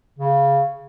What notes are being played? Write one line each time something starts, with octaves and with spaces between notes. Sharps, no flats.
C#3